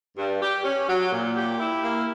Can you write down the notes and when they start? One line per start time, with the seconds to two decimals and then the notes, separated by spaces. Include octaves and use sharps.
0.17 G2
0.41 G4
0.64 C#4
0.88 F#3
1.12 A#2
1.35 G4
1.59 E4
1.83 A#3